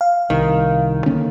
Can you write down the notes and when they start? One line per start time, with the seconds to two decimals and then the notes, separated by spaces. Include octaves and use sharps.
0.01 F5
0.30 C2 D#3
1.06 D3 A#3 C#4